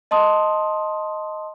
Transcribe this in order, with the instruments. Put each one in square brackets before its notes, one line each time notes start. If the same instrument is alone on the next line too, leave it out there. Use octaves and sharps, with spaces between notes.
[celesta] D#5 A5 C6 D#6